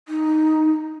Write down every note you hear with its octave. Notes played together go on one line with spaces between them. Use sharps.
D#4